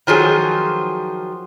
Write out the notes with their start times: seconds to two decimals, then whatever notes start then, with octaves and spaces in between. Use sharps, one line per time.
0.07 D#3 F3 F#3 G#4